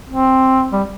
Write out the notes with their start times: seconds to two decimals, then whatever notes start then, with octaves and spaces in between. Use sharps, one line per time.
0.10 C4
0.72 G3